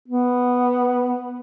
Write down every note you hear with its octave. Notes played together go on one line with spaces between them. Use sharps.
B3